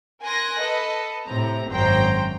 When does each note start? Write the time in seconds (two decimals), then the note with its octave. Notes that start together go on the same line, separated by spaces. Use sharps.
0.23 A#4 G#5 C6 F#6 A#6
0.60 A4 B4 D#5
1.26 A2 C3 C4 A#5
1.68 G#1 F#2 C5 G5 A#5